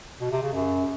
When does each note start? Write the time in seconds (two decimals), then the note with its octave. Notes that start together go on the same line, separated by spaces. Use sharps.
0.21 B2
0.32 C3
0.42 C#3
0.53 F#2